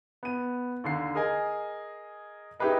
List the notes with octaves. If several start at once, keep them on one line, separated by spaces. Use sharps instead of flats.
B3 D#7
D#2 D3 C7
G#4 A#4 D#5 G#5
D#4 E4 G4 G#4 B4 D#5